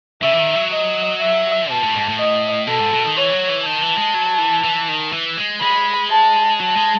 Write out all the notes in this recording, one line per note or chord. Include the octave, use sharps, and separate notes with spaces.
C#3 E5
E3
D#3
F#3
D#5
E5
B2 A5
A2
G#2
A2
D#5
B2 A4
G#2
B2
D#3
E3 C#5
F#3
E3
D#3 A5
E3
G#3
F#3
E3
E3
D#3
E3
G#3
G#3 B5
A5
F#3 A5
G#3